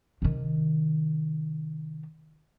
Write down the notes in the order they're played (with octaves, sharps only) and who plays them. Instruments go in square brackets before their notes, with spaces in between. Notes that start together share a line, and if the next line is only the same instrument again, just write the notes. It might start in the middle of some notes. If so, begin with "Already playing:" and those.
[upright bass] C3 D#3